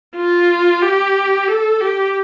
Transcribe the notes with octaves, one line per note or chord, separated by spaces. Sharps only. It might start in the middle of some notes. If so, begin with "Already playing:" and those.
F4
G4
A4
G4